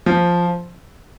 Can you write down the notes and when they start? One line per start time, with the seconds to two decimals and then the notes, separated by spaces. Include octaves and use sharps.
0.06 F3